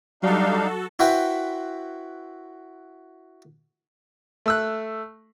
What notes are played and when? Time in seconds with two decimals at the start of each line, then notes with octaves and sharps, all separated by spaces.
0.23 F#3 G3 D4 D#4 F#4 A4 F5
0.99 E4 F#4 B4 C5 E5 G5
4.46 A3 E6 F#6